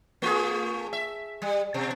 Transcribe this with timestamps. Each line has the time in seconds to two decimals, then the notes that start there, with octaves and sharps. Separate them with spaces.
0.22 A3 F4 G#4
0.93 E5
1.42 G3
1.74 B2